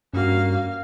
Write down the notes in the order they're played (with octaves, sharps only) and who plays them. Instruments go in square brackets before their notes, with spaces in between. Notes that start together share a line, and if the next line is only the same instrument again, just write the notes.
[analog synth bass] G2 [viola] A#3 F5 [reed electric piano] C#4 F#4